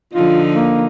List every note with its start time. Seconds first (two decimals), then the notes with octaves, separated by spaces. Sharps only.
0.13 D3 F3 D#4 F4
0.53 A#3